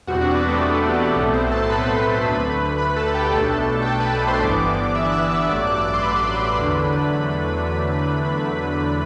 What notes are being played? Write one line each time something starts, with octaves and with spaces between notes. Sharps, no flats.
E2 B2 G3 C4 F#4 F#5
D4 D5
B3 B4
A3 A4
F#4
G4
G4
B1 A2 F#3 A3 B3 A4
C4 C5
A4 A5
C6
B4 B5
D2 D3 A3
B4 B5
A4 A5
G4 G5
B1 B2 A3 D4 A4 A5
G5
A4 A5
B4 B5
A4 A5
C5 C6
G1 G2 E3 B3 D4 D5 D6
E5 E6
F#6
E5 E6
E5 E6
A1 G2 F#3 A3 D5 D6
F#6
E6
D6
C6
B4 B5
E2 D3 F#3 A3 D4